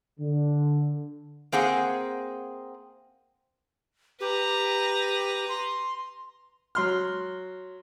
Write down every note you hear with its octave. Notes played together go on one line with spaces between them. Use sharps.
D3
A#3 C4 G#4 F#5
G4 B4 A#5
C6
F#3 C6 F6